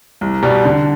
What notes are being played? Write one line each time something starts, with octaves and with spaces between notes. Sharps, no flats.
C2
B2 G3
D3